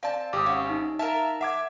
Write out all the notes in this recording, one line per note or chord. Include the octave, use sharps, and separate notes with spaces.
C4 D5 F5 A5
G#1 G4 D6 D#6
C#4 F5 F#5
D#4
A#4 E5 F5 A5
E5 F#5 D6 G#6